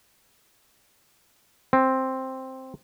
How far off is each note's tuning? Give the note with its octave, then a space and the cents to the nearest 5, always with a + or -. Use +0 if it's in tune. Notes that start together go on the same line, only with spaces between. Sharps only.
C4 +5